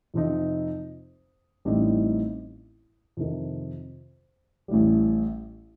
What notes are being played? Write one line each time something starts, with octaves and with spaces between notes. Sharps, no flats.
F2 C3 F3 C4 D#4
A1 A2 G3 C4 D#4
F2 C3 D#3
A1 A2 G3